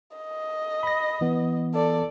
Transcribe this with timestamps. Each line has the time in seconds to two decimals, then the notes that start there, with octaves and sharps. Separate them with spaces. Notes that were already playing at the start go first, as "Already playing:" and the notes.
0.17 D#5
0.83 B5 A#6
1.21 E3 B3
1.74 A4 D5